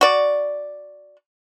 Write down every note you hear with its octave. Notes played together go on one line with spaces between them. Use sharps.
F#4 D5